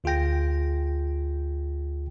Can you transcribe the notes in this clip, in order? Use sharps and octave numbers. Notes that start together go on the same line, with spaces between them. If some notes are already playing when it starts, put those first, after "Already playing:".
D2 F4 G#4 G5 A#6